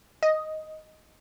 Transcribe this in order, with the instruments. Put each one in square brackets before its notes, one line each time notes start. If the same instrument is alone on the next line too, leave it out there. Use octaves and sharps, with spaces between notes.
[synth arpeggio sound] D#5